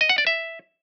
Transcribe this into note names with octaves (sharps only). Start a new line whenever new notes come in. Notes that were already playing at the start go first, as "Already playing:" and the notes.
D#5
F#5
D5
E5